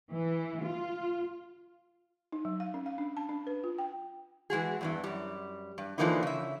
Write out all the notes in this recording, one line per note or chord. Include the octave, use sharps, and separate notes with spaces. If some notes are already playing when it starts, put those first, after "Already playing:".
E3
F4
D#4
F#3
F5
C#4
F5
D4
A5
D4
B4
F4
G5
E3 G#3 F#4 G#4
E2 G2 E3
F#2 G3
G2
D3 E3 F3 A#3 D#4 E4
C#3 E5